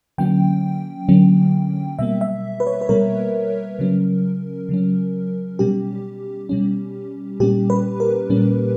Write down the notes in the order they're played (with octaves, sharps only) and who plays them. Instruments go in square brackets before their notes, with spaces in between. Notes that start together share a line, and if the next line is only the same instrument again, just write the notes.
[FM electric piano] D3 F#3 A#3 C#4 G5
D3 F#3 A#3 C#4
B2 G3 A#3 E5
E5
B4
C#5
B4
B2 G3 A#3 A#4
C#3 F#3 C#4
C#3 F#3 C#4
B2 G3 C#4 G4
B2 G3 C#4
A#2 G3 A#3 C#4 G4
B4
A#4
A#2 G3 A#3 C#4